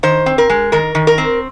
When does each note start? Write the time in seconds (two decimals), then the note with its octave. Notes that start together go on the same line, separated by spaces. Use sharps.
0.03 D#3 C5
0.26 C4
0.38 A#4
0.50 G#3
0.72 D#3 A#4
0.95 D#3
1.07 A#4
1.18 C4